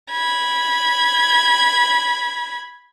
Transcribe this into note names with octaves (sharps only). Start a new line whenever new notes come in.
B5 G#6